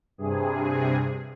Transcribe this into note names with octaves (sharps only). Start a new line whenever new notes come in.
G2 C3 G#4